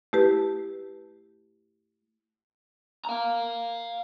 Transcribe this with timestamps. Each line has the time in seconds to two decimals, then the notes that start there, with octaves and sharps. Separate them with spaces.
0.13 A3 E4 G4 B4
3.05 F5 A#5